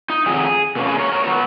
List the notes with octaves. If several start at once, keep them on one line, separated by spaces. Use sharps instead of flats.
D#4
F2 D#3 F#3 G#4
B2 A#3 C#4
G#4 B4
A#4 C#5
A#4 C#5
D#3 F#3 B3 A#4 C#5